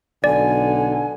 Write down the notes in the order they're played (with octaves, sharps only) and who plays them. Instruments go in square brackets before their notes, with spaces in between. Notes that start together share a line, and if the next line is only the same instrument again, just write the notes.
[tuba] B1 [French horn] D3 [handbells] D5 [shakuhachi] G#5